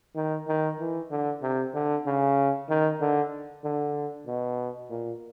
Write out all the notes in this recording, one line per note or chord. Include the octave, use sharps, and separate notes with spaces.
D#3
D#3
E3
D3
C3
D3
C#3
D#3
D3
D3
B2
A#2